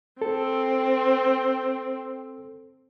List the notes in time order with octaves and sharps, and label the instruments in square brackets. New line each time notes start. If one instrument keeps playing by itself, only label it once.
[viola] C4 [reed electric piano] A4